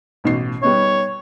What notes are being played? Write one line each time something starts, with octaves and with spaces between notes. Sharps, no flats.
A1 B2 C7
G3 B3 D#4 C#5